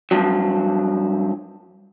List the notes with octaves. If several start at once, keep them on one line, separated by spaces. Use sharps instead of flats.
G2 A#2 F3 F#3